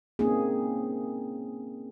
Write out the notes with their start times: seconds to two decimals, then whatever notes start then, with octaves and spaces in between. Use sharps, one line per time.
0.19 A#3 C4 C#4 D#4 G#4